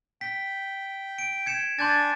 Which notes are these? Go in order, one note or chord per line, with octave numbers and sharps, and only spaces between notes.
G5 B6
D7
G#6 C#7 E7
D4 G#5 C6 G6 A6